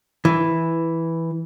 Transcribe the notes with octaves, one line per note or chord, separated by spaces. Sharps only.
E3